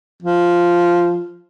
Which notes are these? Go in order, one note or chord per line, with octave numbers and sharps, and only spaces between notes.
F3